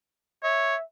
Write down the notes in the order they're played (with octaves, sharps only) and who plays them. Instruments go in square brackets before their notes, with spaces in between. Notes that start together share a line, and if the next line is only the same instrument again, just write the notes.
[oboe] C#5 [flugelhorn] E5